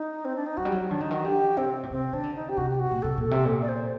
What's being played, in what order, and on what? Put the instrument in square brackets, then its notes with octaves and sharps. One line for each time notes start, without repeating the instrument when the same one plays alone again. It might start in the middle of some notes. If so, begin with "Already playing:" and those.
Already playing: [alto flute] D#4
C4
D4
D#4
[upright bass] F#3 [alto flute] F#4
[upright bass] G3
F#3
[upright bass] D#3 [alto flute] D4
[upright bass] D3 [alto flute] D#4
[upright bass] D#3 [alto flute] F#4
[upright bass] D3 [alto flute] G4
[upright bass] C3 [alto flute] C4
[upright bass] A#2
[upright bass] C3 [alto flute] C4
[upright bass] D#3 [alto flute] D4
[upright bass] D3
[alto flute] D#4
G4
[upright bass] C3 [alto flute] F#4
[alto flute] G4
F#4
[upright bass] A#2
[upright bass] C3 [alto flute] A4
[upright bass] A#2
[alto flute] A4
[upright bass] C3
A#2
[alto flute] D5
C5